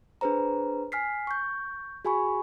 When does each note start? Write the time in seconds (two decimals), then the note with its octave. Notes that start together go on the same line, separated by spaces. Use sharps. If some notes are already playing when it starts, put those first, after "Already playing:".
0.21 D4 G#4 B4 C5 A#5
0.92 G#5 F6 B6 C7
1.27 C#6 G6
2.05 F#4 G#4 G#5 B5 C#6